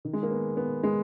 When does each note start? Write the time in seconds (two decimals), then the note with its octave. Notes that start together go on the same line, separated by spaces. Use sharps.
0.05 D#3
0.13 G#3
0.23 A#3
0.31 B3
0.57 B3
0.83 G#3